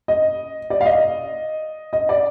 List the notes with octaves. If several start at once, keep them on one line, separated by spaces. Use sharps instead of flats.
D#5
D5
F5
D#5
D#5
D5